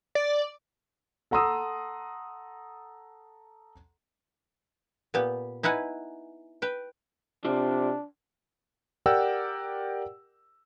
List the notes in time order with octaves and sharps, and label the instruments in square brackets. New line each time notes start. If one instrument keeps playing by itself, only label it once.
[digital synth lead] D5
[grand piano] A4 F#5 A#5 C6 D#6 E6
[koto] A#2 B3 G4
D#4 E4 B4 F#5 G#5
B4 G5
[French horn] C3 [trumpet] D4 [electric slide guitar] F4 C5 D5
[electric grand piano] G4 A#4 D5 F#5 G5 E6